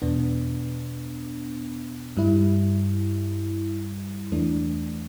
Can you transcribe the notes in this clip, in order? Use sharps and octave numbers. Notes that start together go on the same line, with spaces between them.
E2 B2 B3 D4
G2 G3 E4
E2 E3 A3 D4